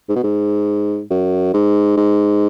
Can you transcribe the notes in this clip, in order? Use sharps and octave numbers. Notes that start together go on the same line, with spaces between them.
G#2
B2
G#2
F#2
G#2
G#2